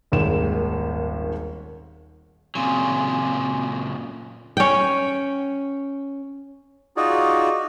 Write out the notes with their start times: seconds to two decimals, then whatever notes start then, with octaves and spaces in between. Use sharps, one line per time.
0.12 D#1 G#1 D#2 G#4 E7
2.55 A#2 C#3 F#3 C4 G#5 C6
4.57 C#4 G5
6.97 D#4 F4 F#4 G#4 D5